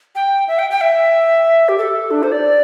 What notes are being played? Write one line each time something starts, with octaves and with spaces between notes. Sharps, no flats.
G5
E5
G5
G5
E5
G4
A4
D4
C5
D5